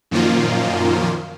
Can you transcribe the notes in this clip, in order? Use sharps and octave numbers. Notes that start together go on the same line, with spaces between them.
F#2 A#2 D#3 F3 A#3 F4